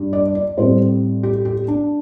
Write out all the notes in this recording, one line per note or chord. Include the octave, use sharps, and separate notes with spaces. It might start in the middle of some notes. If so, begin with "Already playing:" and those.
Already playing: G2
D5
D5
A2 G3 C4 C5
G4
G4
D4